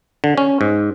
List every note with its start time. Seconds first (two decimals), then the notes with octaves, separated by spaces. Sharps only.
0.24 D3
0.38 C#4
0.61 G#2